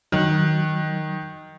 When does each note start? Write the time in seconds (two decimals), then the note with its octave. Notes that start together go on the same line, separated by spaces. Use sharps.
0.12 D#3 F#3 F#6